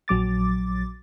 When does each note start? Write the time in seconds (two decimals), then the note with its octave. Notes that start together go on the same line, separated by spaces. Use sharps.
0.08 A#1 F#3 D6 A6